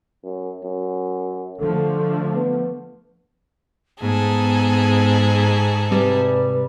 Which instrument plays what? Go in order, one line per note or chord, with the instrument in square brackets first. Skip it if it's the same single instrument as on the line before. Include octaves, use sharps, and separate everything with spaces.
[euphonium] F#2
F#2
[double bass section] D3 F3 A3 [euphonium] A4
[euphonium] B3
[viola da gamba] G#2 [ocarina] B3 [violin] G#4 A4
[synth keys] C3 G3 [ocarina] B4